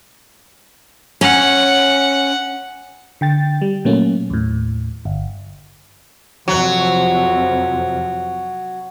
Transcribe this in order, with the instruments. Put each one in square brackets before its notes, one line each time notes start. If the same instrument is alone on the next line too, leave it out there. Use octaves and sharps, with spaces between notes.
[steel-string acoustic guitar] C#4 [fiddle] F#5
[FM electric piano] D3 G5 A6
G3
A#2 F#3 A3 A#3 C#4
D#2 A2
G1
[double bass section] F2 C3 [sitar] F#3